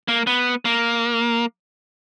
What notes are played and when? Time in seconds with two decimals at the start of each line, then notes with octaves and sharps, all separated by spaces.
0.08 A#3
0.27 B3
0.65 A#3